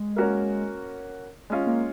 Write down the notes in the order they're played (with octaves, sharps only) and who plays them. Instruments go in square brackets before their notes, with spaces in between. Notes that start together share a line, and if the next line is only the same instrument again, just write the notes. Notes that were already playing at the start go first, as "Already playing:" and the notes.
Already playing: [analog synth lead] G#3
[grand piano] A#3 C#4 F#4 A#4 C#5
G#3 C#4 F4
[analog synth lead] A#3